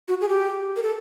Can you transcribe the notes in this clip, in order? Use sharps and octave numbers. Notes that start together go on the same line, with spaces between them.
F#4
G#4
G4
A#4
A4